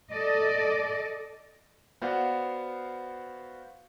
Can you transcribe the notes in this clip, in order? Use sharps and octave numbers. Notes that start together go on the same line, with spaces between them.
A4 D5 D#5
B3 F#4 C5 D5 F5 F#5